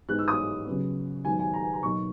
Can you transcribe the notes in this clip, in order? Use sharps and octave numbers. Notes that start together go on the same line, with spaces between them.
G#2 E3 G#3 B3 D#4 F#6
E6
D#6
C#3 F#3 B3
G#2 D#3 F#3 B3 G#5
G#5
A#5
G#5
A#5
B2 F#3 A#3 D#4 C#6